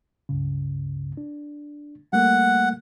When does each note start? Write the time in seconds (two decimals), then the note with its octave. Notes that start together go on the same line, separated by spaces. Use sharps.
0.29 C#2 G2 C#3
1.17 D4
2.13 G3 A3 A#3 F#5